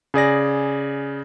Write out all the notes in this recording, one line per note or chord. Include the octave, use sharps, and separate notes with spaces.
C#3 G#4 D5 A#6